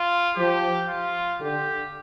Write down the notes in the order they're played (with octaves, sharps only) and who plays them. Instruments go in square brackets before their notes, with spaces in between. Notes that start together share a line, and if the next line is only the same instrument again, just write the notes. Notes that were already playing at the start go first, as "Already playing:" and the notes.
Already playing: [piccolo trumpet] F4
[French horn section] F3 [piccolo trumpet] G4
[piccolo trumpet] F4
[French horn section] D3 [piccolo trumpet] G4